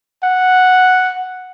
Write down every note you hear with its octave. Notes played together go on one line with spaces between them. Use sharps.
F#5